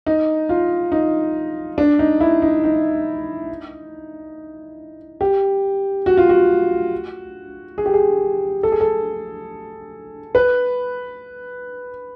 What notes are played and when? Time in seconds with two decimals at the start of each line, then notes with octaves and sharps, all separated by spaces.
0.07 D#4
0.49 F4
0.92 D#4
1.78 D4
1.99 D#4
2.21 E4
2.42 D#4
2.64 D#4
5.21 G4
6.06 F#4
6.17 F4
6.29 F#4
7.78 G#4
7.86 G4
7.94 G#4
8.63 A4
8.72 G#4
8.81 A4
10.35 B4